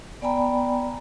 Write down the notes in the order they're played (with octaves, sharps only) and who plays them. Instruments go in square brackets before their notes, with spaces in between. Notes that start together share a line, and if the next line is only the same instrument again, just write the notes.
[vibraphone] B3 D5 G5 G#5 A#5 B5